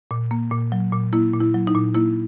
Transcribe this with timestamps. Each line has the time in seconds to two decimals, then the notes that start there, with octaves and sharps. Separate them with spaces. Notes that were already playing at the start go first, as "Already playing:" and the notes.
0.11 A#2
0.31 A#3
0.51 A#2
0.72 F#3
0.93 A#2
1.13 A#3 E4
1.33 A#2
1.40 E4
1.54 F#3
1.67 D#4
1.74 A#2
1.94 A#3 E4